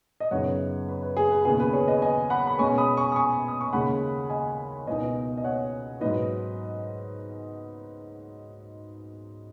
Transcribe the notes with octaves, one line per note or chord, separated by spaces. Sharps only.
D#5
F#2 C#3 B3 D#4 C#5 F#5
B4
B4
G#4
B4
D#2 C#3 B3 G#4
B4
G#4 C#5
B4 D#5
D#5 G#5
F#5 B5
B5
B2 G#3 C#4 G#5 C#6
B5 D#6
G#5 C#6
D#6
G#5 C#6
D#6
C#6
D#2 C#3 G#3 C#4 F#5 B5
D#5 G#5
C#2 B2 B3 D#4 D#5 G#5
D#5
C#5 F#5
G#2 F#3 D#4 B4 D#5